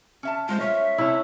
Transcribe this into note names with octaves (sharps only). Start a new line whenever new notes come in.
C#4 E5 A5
G#3 F4 C5
C#4 E5
C3 C#4 E4 A4